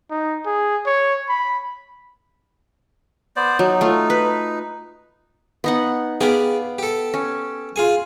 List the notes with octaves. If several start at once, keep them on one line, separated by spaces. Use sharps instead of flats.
D#4
G#4
C#5
B5
B3 C5 D5
F#3 D#4
A3 F4
B4
B3 D#4 F#5
B3 G4 G#4 D5 F5
G4 A4
C#4
F4 G#4 G#5